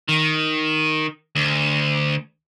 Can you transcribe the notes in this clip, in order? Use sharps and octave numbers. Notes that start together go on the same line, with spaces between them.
D#3
D2